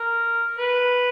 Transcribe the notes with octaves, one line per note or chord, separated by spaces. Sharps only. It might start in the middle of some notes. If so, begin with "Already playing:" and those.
Already playing: A#4
B4